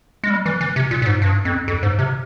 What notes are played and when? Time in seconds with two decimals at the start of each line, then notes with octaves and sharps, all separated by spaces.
0.24 G#3
0.30 G3
0.46 E3
0.61 E3
0.76 C3
0.91 A#2
1.02 A#2
1.06 G#2
1.22 G2
1.45 F2
1.68 F2
1.83 G#2
1.99 C3